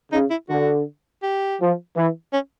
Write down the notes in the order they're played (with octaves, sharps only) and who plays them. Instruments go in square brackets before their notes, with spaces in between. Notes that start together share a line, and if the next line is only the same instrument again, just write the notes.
[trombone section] C#3 [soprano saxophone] D#4
[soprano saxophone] E4
[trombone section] D3 [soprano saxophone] F#4
[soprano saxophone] G4
[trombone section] F3
E3
[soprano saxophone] C#4